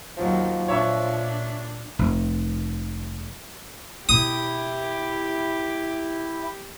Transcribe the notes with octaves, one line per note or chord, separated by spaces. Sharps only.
D#2 F3 F#3
A#2 D4 C#5 E5 C#6
F1
B2 E4 G4 D#6